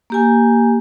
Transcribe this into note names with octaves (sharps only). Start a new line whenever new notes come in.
A#3 G4 G#5